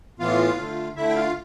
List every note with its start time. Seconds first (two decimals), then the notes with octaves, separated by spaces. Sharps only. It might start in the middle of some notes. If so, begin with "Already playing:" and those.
0.19 A2 E3 B3 F4 F5
0.58 D3 A3
0.96 D3 A3 E4 E5
1.09 G5
1.15 F4 F5